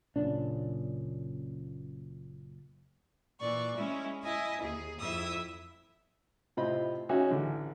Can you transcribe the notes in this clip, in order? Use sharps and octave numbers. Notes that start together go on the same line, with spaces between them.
F#1 A#2 C#3 D4
A#2 E3 D5 C#6
G#3 C#4 E4
E4 D#5 E5 G#5
D#2 G#4
F2 E4 E5 D#6 E6
A2 C3 C4 F4 D#5 B5
C#4 D#4 F#4 G#4 E5 G#5
A1 D3